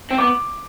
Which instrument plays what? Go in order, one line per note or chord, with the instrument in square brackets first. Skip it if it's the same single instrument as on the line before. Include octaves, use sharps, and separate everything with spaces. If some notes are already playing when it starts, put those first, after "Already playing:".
[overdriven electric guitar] C4
[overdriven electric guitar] B3 [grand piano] D6